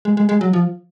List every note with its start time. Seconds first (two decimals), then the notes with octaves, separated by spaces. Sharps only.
0.05 G#3
0.17 G#3
0.29 G#3
0.41 F#3
0.53 F3